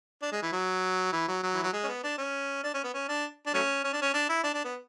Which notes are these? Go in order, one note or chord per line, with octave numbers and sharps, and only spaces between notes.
D4
G#3
E3
F#3
E3
F#3
F#3
E3
F#3
G#3
C#4
B3
D4
C#4
D4
C#4
B3
C#4
D4
D4
F#3 A3 C#4
C#4
D4
C#4
D4
E4
D4
D4
B3